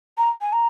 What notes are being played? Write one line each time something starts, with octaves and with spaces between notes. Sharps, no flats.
A#5
G#5
A#5